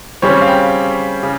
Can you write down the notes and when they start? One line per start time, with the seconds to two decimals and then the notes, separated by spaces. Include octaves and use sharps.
0.22 C#3 G3 C4 C#5
0.42 F5
0.48 G5
1.23 C#3